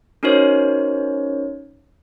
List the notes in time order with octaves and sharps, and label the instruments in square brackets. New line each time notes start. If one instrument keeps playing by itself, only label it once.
[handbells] C#4 D#4 F#4 A#4 C5 C#5